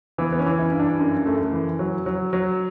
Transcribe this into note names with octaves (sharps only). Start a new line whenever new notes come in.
E3 B3
B3
C#4
E3
E4
G2
D4
F#2
F#2 A3
E3
F#3
F#3
F#3